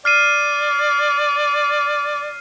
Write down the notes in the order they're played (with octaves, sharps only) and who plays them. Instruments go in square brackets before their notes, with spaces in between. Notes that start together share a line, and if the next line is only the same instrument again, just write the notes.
[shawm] D5 [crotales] F6 C7 D#7